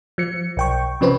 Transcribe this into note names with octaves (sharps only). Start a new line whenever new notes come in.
F3 C#7
B1 G5 C#6
C3 F3 C#4 B4 C5